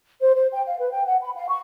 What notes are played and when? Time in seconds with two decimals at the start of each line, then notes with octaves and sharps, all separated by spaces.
0.21 C5
0.34 C5
0.53 G5
0.66 F5
0.79 B4
0.92 G5
1.06 F#5
1.21 B5
1.35 F5
1.48 C#6